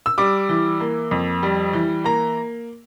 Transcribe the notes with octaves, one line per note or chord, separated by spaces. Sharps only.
E6
G3 D6
E3
A#3
F2
G3
E3
A#3 A#5